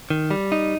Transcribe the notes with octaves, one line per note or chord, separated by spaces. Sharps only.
D#3
G3
D#4